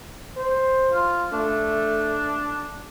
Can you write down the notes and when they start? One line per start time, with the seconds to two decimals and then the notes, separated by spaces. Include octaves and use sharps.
0.37 C5
0.93 F4
1.33 A3 D4